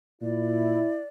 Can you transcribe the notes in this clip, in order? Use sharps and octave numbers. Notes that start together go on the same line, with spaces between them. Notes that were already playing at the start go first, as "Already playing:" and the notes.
A#2 E4 D5